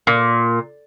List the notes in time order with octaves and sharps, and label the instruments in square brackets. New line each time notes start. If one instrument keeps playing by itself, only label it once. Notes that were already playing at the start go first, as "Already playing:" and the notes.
[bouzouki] A#2